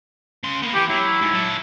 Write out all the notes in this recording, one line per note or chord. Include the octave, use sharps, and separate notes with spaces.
C#3 C6
A#3 B3
E3 G4
F#3 E4
G#2
F#3 A4